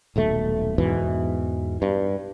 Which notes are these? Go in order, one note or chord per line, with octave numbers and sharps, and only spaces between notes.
D#1 B1 A3
E2 G#2 B2 E3
G2